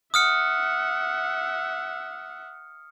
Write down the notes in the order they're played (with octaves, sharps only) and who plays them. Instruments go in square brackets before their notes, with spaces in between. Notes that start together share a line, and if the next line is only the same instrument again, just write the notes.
[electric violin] E5 F#5 [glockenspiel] D#6 F6 C#7